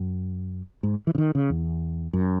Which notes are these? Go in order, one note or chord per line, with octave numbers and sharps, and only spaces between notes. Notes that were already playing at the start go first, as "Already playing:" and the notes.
Already playing: F#2
G#2
E3
C#3
D#3
C#3
E2
F#2